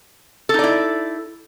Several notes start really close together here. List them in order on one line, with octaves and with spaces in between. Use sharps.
A4 D#4 D5 E4